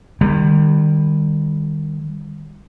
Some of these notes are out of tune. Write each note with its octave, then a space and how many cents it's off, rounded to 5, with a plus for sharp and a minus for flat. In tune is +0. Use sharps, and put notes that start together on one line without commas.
D#3 -20 G3 +25